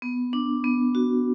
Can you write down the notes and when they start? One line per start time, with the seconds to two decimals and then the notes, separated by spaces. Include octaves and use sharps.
0.02 B3
0.33 D4
0.64 B3
0.95 F#4